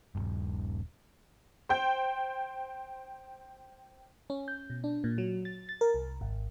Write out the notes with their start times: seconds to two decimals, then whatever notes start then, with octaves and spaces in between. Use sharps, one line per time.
0.15 D#1 G#1 G2
1.69 C5 G5 G6
4.30 C#4
4.48 G6
4.70 B2
4.84 D4
5.04 A#2
5.18 F#3
5.45 A6
5.69 A6
5.81 A#4
5.94 C2
6.21 G#1